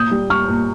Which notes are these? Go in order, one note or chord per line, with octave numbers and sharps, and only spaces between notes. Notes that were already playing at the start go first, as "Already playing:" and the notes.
Already playing: A#2 D#6 G6
G3
G3 C#6 F6
A#2